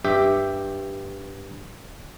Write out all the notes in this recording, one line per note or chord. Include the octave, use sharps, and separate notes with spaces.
G2 G4 E5 G5